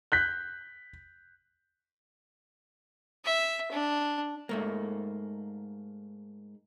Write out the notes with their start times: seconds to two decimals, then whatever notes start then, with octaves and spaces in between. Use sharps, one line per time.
0.12 F#6 G6 B6
3.25 E5
3.71 D4
4.49 G#2 A3 A#3